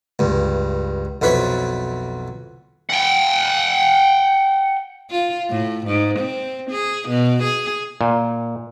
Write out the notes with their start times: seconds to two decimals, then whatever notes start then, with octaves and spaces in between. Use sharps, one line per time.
0.19 C#2 G2
1.22 B1 F2 E4 B4 C#5 B5
2.90 F#5 G5
5.10 F4
5.50 A2
5.87 G#2
6.19 C4
6.71 G#4
7.09 B2
7.43 G#4
8.01 A#2